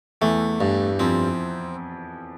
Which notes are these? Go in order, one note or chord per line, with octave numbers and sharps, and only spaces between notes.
E2 E3 A3
G2
F2 F3 C4